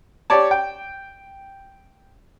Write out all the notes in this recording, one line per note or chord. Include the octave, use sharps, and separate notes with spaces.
G4 C#5 D5 A5
G5